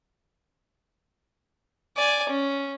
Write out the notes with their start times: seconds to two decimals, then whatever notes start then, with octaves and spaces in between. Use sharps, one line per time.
1.97 D5 G#5
2.29 C#4